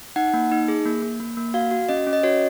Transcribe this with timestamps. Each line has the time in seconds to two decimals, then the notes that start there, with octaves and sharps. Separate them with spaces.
0.16 D#4 F#5
0.34 A#3
0.52 D#4
0.68 G#4
0.85 A#3
1.02 A#3
1.20 A#3
1.37 A#3
1.54 F#4 F5
1.71 F#4
1.89 C#4 D#5
2.07 C#4
2.13 D#5
2.23 F#4 C#5